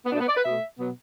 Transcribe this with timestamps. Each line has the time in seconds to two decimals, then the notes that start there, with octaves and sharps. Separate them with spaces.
0.05 B3
0.12 B2 D4
0.14 A3
0.20 B3
0.28 D5
0.37 B4
0.45 B2 A3 E5
0.78 B2 F#3 B3